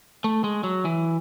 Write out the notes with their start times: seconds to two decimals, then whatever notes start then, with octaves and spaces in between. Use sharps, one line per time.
0.24 A3
0.44 G#3
0.64 F#3
0.85 E3